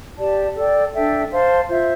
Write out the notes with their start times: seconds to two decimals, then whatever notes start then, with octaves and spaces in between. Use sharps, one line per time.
0.18 G4 D5 A5
0.56 A4 D5 G5
0.93 D4 A4 E5 G5
1.31 C5 F5 A5 C6
1.69 F4 C5 E5